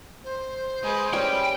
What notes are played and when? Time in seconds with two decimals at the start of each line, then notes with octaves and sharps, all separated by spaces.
0.24 C5
0.83 G#3 B4
1.13 G3 C#4 B4 G5